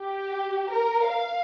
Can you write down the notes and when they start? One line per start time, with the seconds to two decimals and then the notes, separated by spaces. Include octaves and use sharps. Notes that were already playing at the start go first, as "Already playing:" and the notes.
Already playing: G4
0.72 A#4
1.10 F5